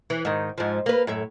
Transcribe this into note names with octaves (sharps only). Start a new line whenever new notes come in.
E3
G#2 D#3
G#2 F3
A#3 B4
F#2 A2 E5